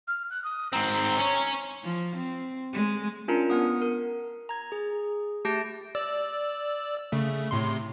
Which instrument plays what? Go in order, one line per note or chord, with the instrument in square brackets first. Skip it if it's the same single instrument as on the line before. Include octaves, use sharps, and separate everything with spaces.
[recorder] F6
F#6
D#6
[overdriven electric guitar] G#2 C4 [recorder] A#5
[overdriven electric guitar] C#4 C#5
[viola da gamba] F3
C4
G#3
[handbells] C#4 D4 F4 A#4 A#5 C#7
B3 F#5 D#6
A#4
A#5 G#6
G#4
A3 G4 A5 G6 A#6 D7
[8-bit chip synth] D5 E6
C#3 A3
A2 C3 C6